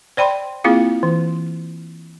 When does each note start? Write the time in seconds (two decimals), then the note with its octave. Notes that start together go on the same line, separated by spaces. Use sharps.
0.17 C5 D5 G5 B5 C6
0.64 A#3 C4 E4 F4 G#4 F5
1.03 E3